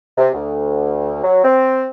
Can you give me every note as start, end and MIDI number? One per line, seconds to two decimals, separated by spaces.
0.18 0.29 48
0.34 1.20 38
1.23 1.42 54
1.44 1.88 60